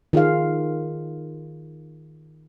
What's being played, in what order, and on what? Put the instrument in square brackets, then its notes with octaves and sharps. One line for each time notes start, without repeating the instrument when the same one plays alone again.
[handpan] D#3 F4 G#4 F5